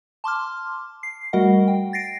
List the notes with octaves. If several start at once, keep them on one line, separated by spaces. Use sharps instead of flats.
A5 C6 D6 F6
C7
G3 A3 F#4 A#4 D#5 F#5
G5
A6 A#6 C7 D7